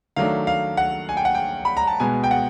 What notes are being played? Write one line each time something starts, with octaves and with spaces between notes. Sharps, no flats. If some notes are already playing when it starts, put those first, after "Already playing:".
D#3 F#3 A3 D4 F5
F5
F#5
G#5
G5
F#5
G5
B5
A#5
A5
B2 G#3 B3 G#5
G5
F#5